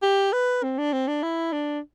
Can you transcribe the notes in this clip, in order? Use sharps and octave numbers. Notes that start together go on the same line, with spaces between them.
G4
B4
C4
D4
C4
D4
E4
D4